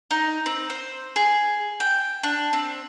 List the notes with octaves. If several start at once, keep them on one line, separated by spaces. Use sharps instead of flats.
D#4
C4
C5
G#4
G5
D4
C4